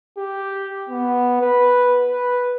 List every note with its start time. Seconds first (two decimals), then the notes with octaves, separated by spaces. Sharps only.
0.18 G4
0.89 B3
1.41 B4
2.11 B4